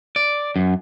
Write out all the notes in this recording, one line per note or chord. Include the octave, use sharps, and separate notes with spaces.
D5
F#2